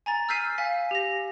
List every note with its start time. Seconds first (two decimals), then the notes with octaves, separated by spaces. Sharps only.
0.06 G#5 A#5 A6
0.29 E6 F6 G6 B6 C7 D#7
0.58 F5 G#5 B6
0.91 G4 A#6